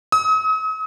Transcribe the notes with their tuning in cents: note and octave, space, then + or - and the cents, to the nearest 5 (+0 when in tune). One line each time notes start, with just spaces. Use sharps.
D#6 +40